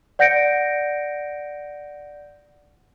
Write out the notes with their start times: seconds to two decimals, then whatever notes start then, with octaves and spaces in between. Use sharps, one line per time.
0.19 D5 F#5 G6 A#6 C#7 D7